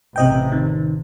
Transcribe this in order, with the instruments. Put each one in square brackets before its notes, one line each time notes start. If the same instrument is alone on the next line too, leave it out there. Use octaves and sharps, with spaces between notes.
[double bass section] A1 C3 [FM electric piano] C4 D#5 G5
[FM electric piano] D#3